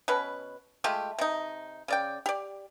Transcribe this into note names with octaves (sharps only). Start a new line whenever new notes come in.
B2 C#4 B4
G#3 A3 F4 G4
C3 D#4
C#3 D5 G5
G4 D5